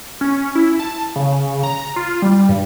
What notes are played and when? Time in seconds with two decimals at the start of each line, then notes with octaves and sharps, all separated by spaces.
0.21 C#4
0.55 E4
0.80 A5
1.16 C#3
1.63 A#5
1.96 F4
2.22 G3
2.49 G2